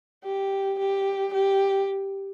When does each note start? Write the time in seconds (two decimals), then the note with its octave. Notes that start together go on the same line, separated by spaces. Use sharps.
0.25 G4
0.79 G4
1.34 G4